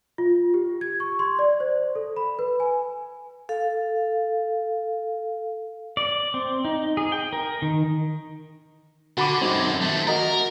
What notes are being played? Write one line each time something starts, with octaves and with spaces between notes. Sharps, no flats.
F4
G4
G#6
C#6
C6
D5
C5
A4
B5
B4
G#5
A4 F5
D5
C4
D#4
G#4
G5
A#4
D#3
D3 F#4 B5 D6
F#2 G#3 C4 D#4
D#3 F3 A3
F#4 A#4 D#5 A#5